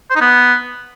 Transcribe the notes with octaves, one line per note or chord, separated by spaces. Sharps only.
C5
D#4
B3